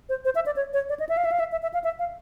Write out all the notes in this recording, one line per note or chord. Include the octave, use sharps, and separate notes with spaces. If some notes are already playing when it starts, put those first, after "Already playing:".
C5
C5
E5
D5
C#5
C#5
D5
D#5
E5
F5
E5
F5
E5
E5
E5
F5
E5
F5